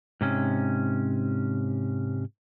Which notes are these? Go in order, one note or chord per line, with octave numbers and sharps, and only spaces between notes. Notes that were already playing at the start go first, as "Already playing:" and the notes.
G#2 C3 C#4